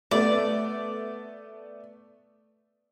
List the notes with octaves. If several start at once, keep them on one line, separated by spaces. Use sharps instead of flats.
A3 B3 D5